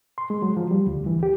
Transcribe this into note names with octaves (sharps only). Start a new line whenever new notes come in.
C6
G#3
F#3
F3
G3
D2
E3
G4